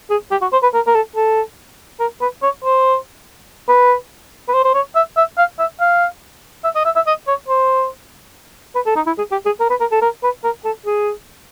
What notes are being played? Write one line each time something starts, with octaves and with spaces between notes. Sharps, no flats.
G#4
G4
F#4
C5
B4
A#4
A#4
A4
A4
A#4
B4
C#5
C5
B4
B4
C5
C5
C#5
E5
E5
F5
E5
F5
E5
D#5
E5
E5
D#5
C#5
C5
B4
A4
D#4
E4
G#4
G4
G#4
A#4
B4
A#4
A4
A#4
B4
A#4
A4
G#4